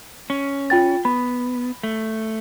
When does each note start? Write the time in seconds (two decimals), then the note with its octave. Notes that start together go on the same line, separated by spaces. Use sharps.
0.30 C#4
0.70 F4 G5 A6
1.05 B3 B5
1.83 A3